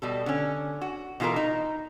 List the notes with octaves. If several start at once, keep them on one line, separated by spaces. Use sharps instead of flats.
B2 G3 A4
D3 C#4
F#4
B2 E3 F4 A4 A#4
D#4